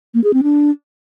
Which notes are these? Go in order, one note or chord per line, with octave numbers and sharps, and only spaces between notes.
A#3
G#4
C4
D4